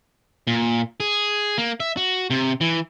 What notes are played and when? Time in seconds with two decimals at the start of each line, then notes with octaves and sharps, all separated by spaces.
0.47 A#2
1.00 G#4
1.58 A#3
1.80 E5
1.97 F#4
2.30 C3
2.61 E3